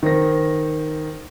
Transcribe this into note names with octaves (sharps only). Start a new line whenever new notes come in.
D#3 C5 A#6